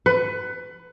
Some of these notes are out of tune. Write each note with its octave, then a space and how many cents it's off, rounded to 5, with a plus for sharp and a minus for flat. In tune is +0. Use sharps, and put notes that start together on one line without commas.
B4 +20